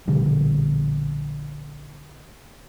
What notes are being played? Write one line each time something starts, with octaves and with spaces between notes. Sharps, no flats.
A#1 B2 D3 G3